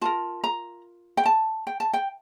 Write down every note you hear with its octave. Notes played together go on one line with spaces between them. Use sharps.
F4 A#4 A5
A#5
G5
A5
G5
A5
G5